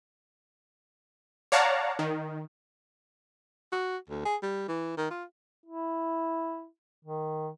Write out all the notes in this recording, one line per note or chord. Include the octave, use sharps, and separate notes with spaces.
C#5 D5 F5 F#5 A5 A#5
D#3
F#4
D2
G#4
G3
E3
D#3
F4
E4
D#3